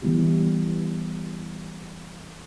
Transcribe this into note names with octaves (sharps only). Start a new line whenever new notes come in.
E3 G3 B3 E4 G4